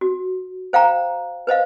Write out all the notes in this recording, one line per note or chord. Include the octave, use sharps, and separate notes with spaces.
F#4
C5 F5 G5 A#5
B4 C5 D#5 F5